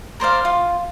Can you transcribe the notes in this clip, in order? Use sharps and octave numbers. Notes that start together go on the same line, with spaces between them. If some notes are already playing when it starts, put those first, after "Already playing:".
A#4 C5 D5 F5
F4